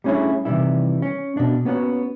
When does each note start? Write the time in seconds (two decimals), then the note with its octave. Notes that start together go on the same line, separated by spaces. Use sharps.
0.04 G3 A3 C#4 D4 E4 G#4
0.45 C3 D#3 E3 G3 E4
1.02 C#4
1.37 B2 D4
1.65 A#3 B3 C#4 D4 F#4 C#5